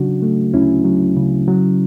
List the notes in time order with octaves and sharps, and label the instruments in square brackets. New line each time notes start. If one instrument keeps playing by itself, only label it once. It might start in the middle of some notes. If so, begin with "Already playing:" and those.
Already playing: [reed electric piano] C#3 F#3 D4 F#4
A3
D2 C#4 E4
F#3
C#3
F#3